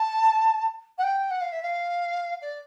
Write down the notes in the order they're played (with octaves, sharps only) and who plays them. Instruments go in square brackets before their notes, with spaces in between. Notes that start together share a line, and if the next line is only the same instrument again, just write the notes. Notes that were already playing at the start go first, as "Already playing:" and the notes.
Already playing: [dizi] A5
F#5
G5
F#5
F5
E5
F5
D5